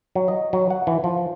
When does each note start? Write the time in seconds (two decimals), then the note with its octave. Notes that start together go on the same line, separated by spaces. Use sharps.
0.15 F#3
0.28 D#5
0.53 F#3
0.70 F#5
0.87 E3
1.04 F3